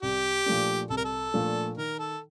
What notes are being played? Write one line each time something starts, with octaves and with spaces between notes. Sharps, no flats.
C2 G4
A#2 F3 A3 D4
C2 A4
A#4
A4
A#2 F3 A3 D4
D#3 A#4
A4